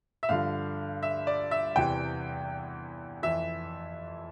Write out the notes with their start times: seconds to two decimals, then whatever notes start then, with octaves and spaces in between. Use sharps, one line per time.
0.23 E5
0.29 G2 D3 F3 F5
1.03 E5
1.27 D5
1.51 E5
1.76 E2 C3 E3 G5
3.23 F2 E3 E5